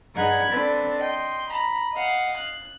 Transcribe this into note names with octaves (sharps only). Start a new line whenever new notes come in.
G2 D#4 G#4 F#5 B5 G#6
C4 D4 A4 B4
D#5 G5 C6
A#5 B5
D#5 F5 F#5
F#6